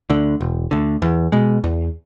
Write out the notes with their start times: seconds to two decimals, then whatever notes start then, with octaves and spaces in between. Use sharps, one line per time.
0.10 D2 D3
0.41 E1
0.71 D2 D3
1.02 E2
1.32 B2 G#3
1.64 E2